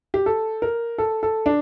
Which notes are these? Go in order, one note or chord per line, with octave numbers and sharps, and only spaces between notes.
G4
A4
A#4
A4
A4
D4